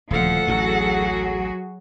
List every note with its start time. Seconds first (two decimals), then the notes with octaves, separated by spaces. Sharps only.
0.11 D#1 D2 C#3 F3 A4 F5 F#5
0.48 A1 D2 A2 F#3 F#4 G#4